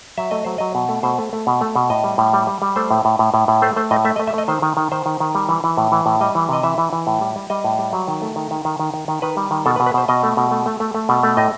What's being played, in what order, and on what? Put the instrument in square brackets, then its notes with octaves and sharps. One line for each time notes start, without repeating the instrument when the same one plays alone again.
[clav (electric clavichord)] F#3 E5
A3 D#5
F#3 C5
F#3 D#5
B2
A3
B2 C5
A3
A3
B2
A3
B2
A2 D#5
G3
A2
G3
G3
G3
A3 C5
A2
A2
A2
A2
A2
A3 C5
A3 C5
A2 D#5
A3 E5
D#5
A3
E5
A3 D#5
D#3 C5
D#3
D#3
D#3 C5
D#3
D#3
G3
E3
E3
A2
E3
A2
G3 D#5
E3
C3 D#5
E3 E5
E3
E3
A2
G3
G3
G3 D#5
A2
G3
F#3
D#3
A3
D#3
D#3
D#3
D#3
D#3
D#3
D#3 B4
G3
D#3
B2 A4
B4
B2
B4
B2 C5
B2 D#5
A3
B2
A3
A3
A3
A3
B2
A3
A2 D#5